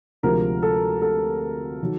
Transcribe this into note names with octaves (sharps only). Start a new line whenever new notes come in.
D2 C3 F3 G#3 A#4
A4
A4
D#3 F#3